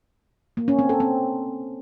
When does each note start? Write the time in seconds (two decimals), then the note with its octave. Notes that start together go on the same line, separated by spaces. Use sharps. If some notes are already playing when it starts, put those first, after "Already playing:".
0.57 A#3
0.68 C#4
0.79 C4
0.89 A4
1.00 C4